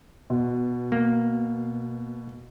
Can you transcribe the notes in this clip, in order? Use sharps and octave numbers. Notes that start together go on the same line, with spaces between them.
B2
A#3